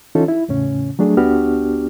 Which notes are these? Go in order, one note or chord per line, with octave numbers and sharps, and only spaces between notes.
E3 C#4 D#4 F4 A4
E4
E2 A2 C#3 C#4
F#3 A3 D4 G#4
D2 B3 D4 F#4 G4 F6